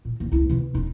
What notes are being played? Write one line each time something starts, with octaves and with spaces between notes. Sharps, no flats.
A#2
D#2
C#2 E4
C3 E3
E1 D#4